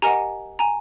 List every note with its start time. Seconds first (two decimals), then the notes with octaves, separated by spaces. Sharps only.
0.02 G4 A#4 D#5 F#5 G#5 A#5
0.59 G#5 A#5